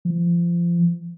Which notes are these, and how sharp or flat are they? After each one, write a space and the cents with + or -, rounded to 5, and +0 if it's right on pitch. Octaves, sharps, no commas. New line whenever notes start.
F3 -25